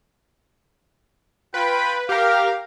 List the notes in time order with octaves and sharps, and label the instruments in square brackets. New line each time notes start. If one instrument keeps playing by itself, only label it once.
[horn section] F4 G5 B5 [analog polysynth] B4
[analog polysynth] G4 A#4 [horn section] F5